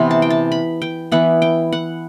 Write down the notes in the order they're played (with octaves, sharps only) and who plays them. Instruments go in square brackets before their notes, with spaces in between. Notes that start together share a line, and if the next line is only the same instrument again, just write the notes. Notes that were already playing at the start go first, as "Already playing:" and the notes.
Already playing: [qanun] C3 E3 B3 C6
A5
G5
A5
B5
G5
E3 B3 E4 F#5
G5
F#5